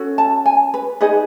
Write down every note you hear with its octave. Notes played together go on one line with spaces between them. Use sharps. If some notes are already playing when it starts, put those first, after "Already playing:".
Already playing: C#4 F#4 A4
A5
G#5
B4
D#4 G#4 B4 D#5